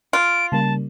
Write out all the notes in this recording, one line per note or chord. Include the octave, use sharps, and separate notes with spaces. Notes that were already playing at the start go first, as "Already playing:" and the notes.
F4 D7
C#3 G3 A#3 A5